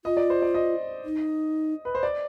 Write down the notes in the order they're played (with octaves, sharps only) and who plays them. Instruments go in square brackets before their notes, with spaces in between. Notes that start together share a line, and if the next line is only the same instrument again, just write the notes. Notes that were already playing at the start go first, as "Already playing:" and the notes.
[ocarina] F4 [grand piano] D#5
[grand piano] D5
C5
D5
D#5
[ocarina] D#4
[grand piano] B4
C5
D5